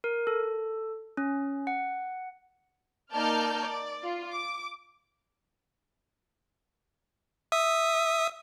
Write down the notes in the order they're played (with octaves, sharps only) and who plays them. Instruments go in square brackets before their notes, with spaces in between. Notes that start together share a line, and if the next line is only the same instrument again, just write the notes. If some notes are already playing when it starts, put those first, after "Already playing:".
[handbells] A#4
A4
C#4
F#5
[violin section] A#3 D#4 D5 A5 F6 G6
D5
F4
D6
[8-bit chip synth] E5 D#6